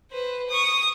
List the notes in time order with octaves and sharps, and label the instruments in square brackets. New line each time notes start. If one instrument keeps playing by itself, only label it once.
[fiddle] B4 C5
C#6 D#6